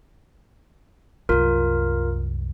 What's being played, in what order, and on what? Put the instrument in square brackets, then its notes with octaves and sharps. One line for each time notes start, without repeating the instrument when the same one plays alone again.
[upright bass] C2 F#2 [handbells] F4 A#4